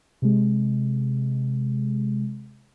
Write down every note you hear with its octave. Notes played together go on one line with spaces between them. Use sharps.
C3 G#3